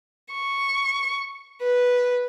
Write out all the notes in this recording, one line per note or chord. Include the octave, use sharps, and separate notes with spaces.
C#6
B4